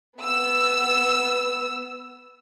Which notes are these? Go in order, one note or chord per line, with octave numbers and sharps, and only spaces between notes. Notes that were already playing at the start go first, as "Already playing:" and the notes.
B3 E6